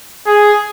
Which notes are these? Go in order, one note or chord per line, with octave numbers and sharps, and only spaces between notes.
G#4